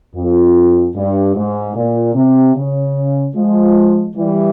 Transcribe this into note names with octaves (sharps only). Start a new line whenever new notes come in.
F2
G2
G#2
A#2
C3
C#3
F3 G#3
E3 G3